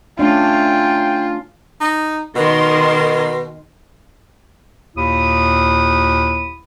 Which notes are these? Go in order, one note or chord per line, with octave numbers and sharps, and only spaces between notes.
A3 C#4 D4 F4 G5
D#4
B2 D#3 A#4 C6
D#2 A#2 E4 B5 D#6